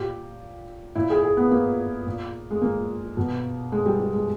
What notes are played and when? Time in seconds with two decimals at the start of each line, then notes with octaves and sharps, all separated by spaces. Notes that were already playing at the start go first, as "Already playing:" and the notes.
Already playing: A#2 G4
0.95 A#2 E4
1.10 G#4
1.23 G#4
1.37 B3
1.51 A#3
2.06 A#2
2.51 G#3
2.62 A#3
3.17 B2
3.72 G#3
3.86 G3
4.00 G3
4.14 G#3